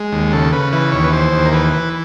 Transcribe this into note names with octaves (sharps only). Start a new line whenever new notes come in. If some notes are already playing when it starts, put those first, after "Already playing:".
Already playing: G#3
D#2
C#3 A4
C#3 B4
E3 B4
D#2 C#5
B4
E3 C5
D#2
A#4
E3 B4
E3